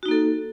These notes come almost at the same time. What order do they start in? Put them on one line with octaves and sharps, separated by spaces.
F#4 D#4 A#3 A4